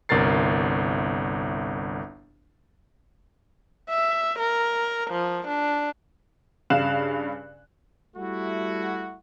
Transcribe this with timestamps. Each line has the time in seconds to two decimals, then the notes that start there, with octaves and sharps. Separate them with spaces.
0.09 G1 C2 A#4 A6 C7
3.90 E5
4.40 A#4
5.11 F3
5.48 D4
6.70 G2 C#3 F5 F#6 E7
8.16 G3 A3 E4 F#4